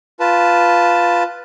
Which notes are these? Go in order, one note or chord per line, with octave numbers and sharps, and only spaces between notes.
F4 B4 A5